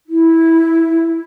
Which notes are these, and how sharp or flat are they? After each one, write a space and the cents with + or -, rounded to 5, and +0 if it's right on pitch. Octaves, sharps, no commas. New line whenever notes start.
E4 -10